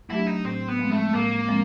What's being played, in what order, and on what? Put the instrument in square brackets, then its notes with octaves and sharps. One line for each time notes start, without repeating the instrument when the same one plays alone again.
[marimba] F#3 A3 D4 G4 [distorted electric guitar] E4
[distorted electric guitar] D#4
[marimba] A2 [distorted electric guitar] C4
[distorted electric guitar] B3
[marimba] F3 G#3 C4
[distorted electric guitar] A3
[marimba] A2 [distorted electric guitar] A#3
[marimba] F3 G#3 C4